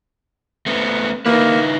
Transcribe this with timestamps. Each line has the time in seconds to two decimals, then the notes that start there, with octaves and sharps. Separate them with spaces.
0.66 A3 B3 C4
1.26 A#3 D#4 E4 B4